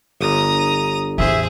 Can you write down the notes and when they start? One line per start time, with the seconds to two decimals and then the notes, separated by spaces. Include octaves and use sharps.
0.21 G1 A#5 D#6
1.18 A1 E2 G#4 C5 E5